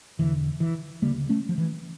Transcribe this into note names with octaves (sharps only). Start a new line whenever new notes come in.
E1 E2 D3 E3
E3
D2 C#3 G3 A#3
A3 C#4
F3
E3